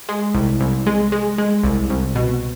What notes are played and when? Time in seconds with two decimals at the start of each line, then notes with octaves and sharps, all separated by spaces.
0.09 G#3
0.34 C2
0.60 C2
0.86 G#3
1.12 G#3
1.38 G#3
1.64 C2
1.90 C2
2.16 B2